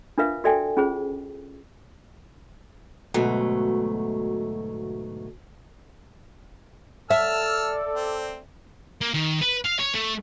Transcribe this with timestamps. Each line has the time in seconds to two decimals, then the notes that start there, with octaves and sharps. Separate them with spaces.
0.18 D4 F4 A#4 B4 E5 F5
0.44 F#4 A4 D5 E5 G5 G#5
0.77 C#4 F4 G#4 C5
3.14 D2 G#2 B2 F#3 A3
7.10 A4 D5 E5 A5 E6 F6
7.95 C4
9.01 A#3
9.14 D#3
9.41 B4
9.64 F5
9.79 C#5
9.94 A3